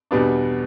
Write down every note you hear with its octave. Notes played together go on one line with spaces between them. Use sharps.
E2 B2 G3 B3 D4